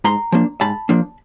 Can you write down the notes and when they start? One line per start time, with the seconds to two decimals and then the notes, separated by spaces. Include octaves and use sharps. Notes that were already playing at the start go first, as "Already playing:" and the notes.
0.04 G#2 A#5 C6
0.32 F3 A#3 D4
0.61 G#2 A5 B5
0.89 F3 A#3 D4